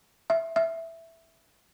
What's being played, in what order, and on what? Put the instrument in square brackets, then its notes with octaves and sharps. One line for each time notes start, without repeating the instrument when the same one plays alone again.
[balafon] E5
E5